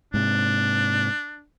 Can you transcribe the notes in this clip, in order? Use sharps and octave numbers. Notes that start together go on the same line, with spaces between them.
G#2 C3 D4